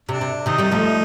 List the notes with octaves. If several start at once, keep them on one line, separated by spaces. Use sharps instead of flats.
C3 D4
C3
C3 D#3 D#4
D#3 G3
F3 A3